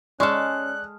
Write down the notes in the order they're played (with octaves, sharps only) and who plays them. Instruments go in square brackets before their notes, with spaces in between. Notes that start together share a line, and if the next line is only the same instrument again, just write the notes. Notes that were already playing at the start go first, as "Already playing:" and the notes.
[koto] G#3 A4 [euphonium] C#4 [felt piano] D5 C#6 F6 [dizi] F#6